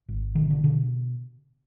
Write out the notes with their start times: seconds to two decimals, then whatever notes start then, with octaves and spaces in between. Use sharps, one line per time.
0.08 G#1
0.35 B2 D#3
0.50 D3
0.64 B2 D3